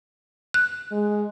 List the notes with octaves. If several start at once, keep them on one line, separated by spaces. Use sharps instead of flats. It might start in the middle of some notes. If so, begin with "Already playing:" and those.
F#6
G#3